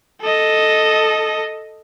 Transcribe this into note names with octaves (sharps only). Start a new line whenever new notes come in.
A4 D#5